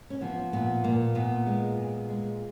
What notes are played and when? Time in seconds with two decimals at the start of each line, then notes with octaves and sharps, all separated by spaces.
0.10 C#4
0.21 F3 B3
0.53 A#2 B3
0.84 A#2 A#3
1.15 A#2 B3
1.46 G#3
1.77 A#2
2.09 G#3